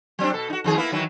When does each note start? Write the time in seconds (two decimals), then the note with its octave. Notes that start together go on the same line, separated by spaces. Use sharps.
0.19 F#3 C4 D4
0.33 B2 A4
0.50 D#4 F#4
0.64 F2 D#3 G#4
0.77 A#3 B3 E4
0.92 D#3 E3 F#3